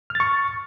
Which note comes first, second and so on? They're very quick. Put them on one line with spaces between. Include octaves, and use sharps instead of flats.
F6 A6 C#6